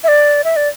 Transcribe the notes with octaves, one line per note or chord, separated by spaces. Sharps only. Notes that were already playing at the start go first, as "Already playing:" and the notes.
E5
D5
E5
D5